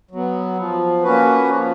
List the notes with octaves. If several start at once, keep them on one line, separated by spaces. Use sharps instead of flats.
F#3 B3
F3
A#3 C#4 F#4 B4
F3